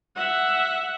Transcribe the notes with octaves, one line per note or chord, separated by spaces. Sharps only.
E5 F#5